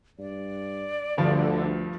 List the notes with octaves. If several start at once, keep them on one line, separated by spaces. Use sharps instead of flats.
G2 D5
D2 G2 D3 F3